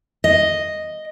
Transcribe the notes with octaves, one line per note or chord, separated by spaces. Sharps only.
D#5